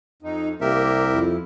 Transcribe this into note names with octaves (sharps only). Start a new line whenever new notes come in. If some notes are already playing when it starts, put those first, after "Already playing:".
F2 D#4
C2 A#3 G4 A#4 E5
F2 E4